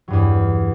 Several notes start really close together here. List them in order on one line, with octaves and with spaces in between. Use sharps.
F#3 G2 E2